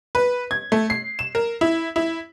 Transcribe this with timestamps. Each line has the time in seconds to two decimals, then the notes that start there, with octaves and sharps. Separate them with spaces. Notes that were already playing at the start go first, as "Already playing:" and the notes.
0.15 B4
0.51 G#6
0.72 A3
0.90 C7
1.19 E7
1.35 A#4
1.61 E4
1.96 E4